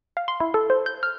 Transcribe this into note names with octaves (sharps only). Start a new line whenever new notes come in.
F5
C6
E4
A4
C5
G6
F6